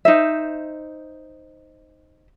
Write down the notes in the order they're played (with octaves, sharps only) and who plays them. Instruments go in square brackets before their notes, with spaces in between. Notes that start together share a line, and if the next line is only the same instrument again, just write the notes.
[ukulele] D#4 C5 E5